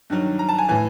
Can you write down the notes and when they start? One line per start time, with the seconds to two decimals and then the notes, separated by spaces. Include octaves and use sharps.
0.10 G2 D#3 F#3
0.39 A#5
0.49 A5
0.58 G#5
0.69 A2 E3 G#5